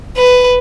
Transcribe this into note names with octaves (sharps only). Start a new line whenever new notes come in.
B4